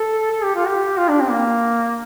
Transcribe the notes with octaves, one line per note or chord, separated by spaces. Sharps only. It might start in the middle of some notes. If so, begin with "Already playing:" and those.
Already playing: A4
A4
G4
F4
G4
F4
D4
C4
A#3